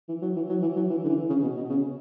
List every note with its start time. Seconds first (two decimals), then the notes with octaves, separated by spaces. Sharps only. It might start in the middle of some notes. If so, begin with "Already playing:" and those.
0.08 E3
0.22 F#3
0.36 E3
0.49 F#3
0.62 E3
0.76 F#3
0.90 E3
1.04 D3
1.09 E3
1.29 C#3
1.43 B2
1.57 B2
1.69 C#3